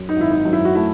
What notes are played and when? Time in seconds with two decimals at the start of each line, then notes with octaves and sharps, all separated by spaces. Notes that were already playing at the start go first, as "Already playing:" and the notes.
Already playing: F#2
0.09 D#4
0.16 G#1 E4
0.31 D#4
0.45 F#2
0.53 E4
0.65 F#4
0.75 A3 E4